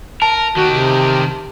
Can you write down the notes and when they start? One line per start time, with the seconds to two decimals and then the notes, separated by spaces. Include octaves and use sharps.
0.22 A#4 A5
0.57 D#3 F#4 G4
0.71 C3